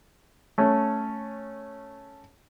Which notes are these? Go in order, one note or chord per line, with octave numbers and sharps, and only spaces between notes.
A3 C#4